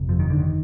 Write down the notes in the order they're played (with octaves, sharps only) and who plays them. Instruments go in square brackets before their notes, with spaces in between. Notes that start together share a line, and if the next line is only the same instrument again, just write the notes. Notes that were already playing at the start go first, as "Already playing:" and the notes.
Already playing: [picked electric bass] G1 F2 C3
F3
D#3
D3
D#3